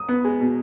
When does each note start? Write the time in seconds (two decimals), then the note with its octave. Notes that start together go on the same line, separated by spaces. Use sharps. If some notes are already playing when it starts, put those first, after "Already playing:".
Already playing: D#6
0.09 B3
0.25 G#3
0.40 B2